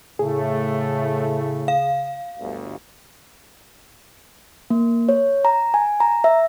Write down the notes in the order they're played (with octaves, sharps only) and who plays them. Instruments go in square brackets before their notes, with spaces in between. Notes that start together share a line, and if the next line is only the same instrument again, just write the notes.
[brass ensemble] A2 A3 [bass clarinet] C#3 [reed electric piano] G#4
[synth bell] F5
[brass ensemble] G1 D2
[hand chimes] A#3
C#5
A#5
G#5
A#5
E5